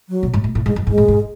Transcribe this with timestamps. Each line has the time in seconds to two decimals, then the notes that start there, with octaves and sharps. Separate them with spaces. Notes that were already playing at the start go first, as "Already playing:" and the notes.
0.09 F#3
0.23 B2
0.34 G#2
0.44 A2
0.55 A2
0.66 G#2 G#3
0.76 F#2
0.87 G#2 G#3
0.98 A2
1.08 G#2